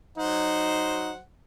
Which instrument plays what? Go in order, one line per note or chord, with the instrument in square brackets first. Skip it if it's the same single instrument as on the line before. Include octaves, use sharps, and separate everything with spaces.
[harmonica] F#3 C5 F#5 [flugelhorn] D#4